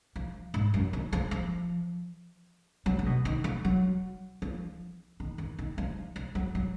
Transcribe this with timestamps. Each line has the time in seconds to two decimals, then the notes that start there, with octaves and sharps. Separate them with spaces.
0.16 F3
0.54 G#2
0.74 F#2
0.93 D#3
1.13 F3
1.31 F3
2.86 F#3
2.99 D3
3.06 B2
3.25 D#3
3.44 F3
3.65 F#3
4.42 F3
5.20 D#3
5.38 D#3
5.59 D#3
5.78 F3
6.16 F3
6.35 F#3
6.55 F#3